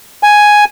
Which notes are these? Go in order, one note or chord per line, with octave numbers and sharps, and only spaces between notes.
G#5